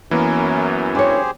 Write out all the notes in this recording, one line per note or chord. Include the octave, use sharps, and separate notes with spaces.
F#2 E3 A#3 B3 C#4 A#4 B4
D4 G4 G#4 C5 C#5